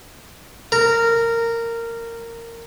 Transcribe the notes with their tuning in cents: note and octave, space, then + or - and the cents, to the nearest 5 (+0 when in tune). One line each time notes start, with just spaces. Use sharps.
A#4 -15